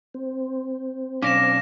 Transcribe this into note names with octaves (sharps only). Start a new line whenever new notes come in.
C4
B1 C#4 D4 C#5 F5 D6 A#6 E7